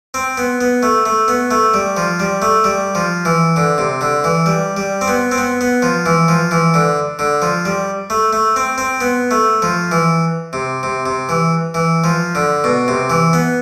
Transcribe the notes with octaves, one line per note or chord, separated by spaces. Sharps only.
C4
B3
B3
A3
A3
B3
A3
G3
F3
G3
A3
G3
F3
E3
D3
C3
D3
E3
G3
G3
C4
B3
C4
B3
B3
F3
E3
F3
E3
D3
D3
F3
G3
A3
A3
C4
C4
B3
A3
F3
E3
C3
C3
C3
E3
E3
F3
D3
B2
C3
E3
B3